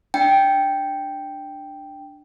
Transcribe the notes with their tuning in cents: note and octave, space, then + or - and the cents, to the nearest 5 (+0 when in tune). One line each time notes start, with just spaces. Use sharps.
D4 +10 G5 +0